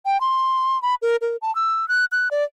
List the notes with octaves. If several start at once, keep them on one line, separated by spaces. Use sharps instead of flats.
G5
C6
B5
A#4
A#4
A5
E6
F#6
F#6
D5